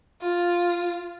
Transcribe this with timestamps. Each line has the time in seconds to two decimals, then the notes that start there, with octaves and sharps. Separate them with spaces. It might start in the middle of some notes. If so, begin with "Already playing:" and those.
0.22 F4